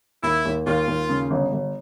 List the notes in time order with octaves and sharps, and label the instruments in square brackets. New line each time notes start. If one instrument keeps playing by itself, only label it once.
[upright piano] D#2 [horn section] E4
[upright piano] D#2
[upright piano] D#2 [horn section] F4
[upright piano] D#2
C#3
G1
G1